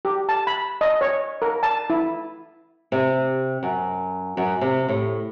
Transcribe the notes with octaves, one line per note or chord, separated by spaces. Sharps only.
G4
A5
B5
D#5
C#5
A#4
A5
E4
C3
F#2
F#2
C3
A2